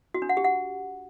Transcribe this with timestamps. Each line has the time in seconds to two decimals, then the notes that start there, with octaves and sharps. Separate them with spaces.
0.14 F#4
0.22 D4
0.29 F#5
0.37 G4
0.44 F#5